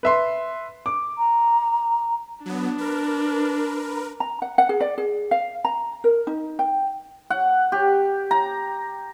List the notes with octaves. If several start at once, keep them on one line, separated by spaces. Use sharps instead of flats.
B4 E5 C6
D6
A#5
F#3 B3 D4
A#4 B4
A#5
F#5
F#5
G#4
D5
G#4
F5
A#5
A#4
D#4
G5
F#5
G4
A#5